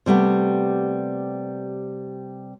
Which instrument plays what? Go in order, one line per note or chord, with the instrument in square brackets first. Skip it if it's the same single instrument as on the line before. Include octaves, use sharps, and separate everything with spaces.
[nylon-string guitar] C3 G3 A3 B3